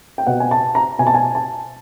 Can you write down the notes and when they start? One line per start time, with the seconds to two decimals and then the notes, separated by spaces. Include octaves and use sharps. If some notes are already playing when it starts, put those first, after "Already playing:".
0.18 G5
0.27 B2 F#5
0.40 G#5
0.51 A5
0.75 A#5
0.99 B2 G#5
1.07 A5
1.15 G#5
1.35 A5